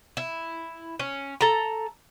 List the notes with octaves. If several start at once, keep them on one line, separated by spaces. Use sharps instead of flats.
E4
C#4
A4 A#5